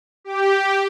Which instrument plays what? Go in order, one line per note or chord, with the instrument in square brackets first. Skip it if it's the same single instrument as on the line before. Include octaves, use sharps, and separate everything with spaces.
[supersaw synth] G4